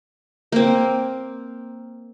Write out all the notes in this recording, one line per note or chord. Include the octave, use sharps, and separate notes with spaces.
A#3 C4